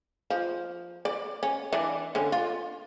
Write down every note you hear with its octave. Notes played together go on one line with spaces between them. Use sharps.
F3
D5
C#4
E3 D4
D3 C#4
F4